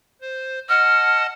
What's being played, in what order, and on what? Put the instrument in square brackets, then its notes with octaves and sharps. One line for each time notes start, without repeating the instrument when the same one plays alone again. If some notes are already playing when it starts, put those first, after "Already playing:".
[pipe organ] C5
[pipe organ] D#5 F#5 A5 [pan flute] F6